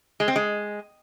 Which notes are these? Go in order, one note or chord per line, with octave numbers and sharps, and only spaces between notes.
G#3
C4
G#3